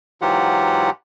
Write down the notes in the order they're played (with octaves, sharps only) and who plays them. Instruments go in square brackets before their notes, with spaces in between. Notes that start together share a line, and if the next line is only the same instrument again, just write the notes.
[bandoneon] G#2 E3 F#3 F4 G4 F#5